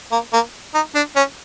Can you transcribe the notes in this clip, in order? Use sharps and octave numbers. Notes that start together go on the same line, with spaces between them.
A#3
A#3
D#4
D4
C#4